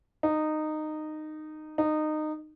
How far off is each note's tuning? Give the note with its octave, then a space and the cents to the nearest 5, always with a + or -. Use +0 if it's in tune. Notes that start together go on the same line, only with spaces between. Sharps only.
D#4 -15
D#4 -20